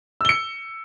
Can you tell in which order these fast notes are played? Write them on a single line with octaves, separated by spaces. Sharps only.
E6 G7 C#7